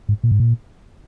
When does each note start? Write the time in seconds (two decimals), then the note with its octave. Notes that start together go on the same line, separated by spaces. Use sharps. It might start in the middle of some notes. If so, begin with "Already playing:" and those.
0.09 G#2
0.24 A#2
0.32 G#2
0.40 A#2